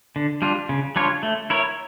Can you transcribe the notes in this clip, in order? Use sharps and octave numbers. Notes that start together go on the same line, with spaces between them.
D3
G3 D4 F4
C#3
G3 D4 F4 C#5
A3
E4 A#4 C#5